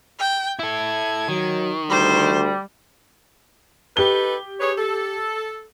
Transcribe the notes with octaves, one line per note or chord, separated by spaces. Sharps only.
G5
E4 A4 G#6
D#3 F#3
D2 G3 C5
D#4 G4 A4 B4 G7
G#4 B4 C#5
A4